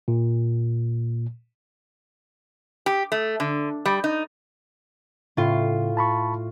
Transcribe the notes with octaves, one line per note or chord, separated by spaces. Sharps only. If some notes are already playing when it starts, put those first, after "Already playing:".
A#2
G4
A3
D3
G3
D#4
A2 C#3 F4
A5 B5 C#6